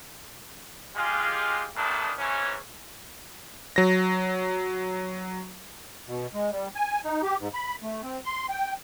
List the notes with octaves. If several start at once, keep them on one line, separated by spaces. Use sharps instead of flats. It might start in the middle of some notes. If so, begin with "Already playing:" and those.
G#3 F4 G4
G2 A#2 D#3 A3 B3 D4
G#2 E3 C#4
F#3 A#6
B2
G#3
G3
G#5
D#4
G4
G#2
B5
A3
C4
C6
G5